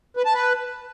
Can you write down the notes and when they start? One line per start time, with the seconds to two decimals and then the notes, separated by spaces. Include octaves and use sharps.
0.16 B4
0.25 A5
0.34 B4